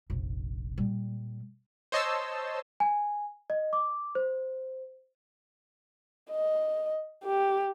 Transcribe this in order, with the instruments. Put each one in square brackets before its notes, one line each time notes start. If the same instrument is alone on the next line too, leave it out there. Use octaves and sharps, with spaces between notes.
[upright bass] F1 A#1
A#2 G3
[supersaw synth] C5 C#5 D#5 A5 C6 E6
[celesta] G#5
D#5
D6
C5
[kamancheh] D#5
G4